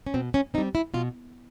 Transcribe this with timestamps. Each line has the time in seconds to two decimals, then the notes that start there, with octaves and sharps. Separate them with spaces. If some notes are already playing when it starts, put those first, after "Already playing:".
0.07 C#4
0.14 B2 C4
0.34 C#4
0.54 C4 D#4
0.58 G3
0.75 E4
0.94 B2 F4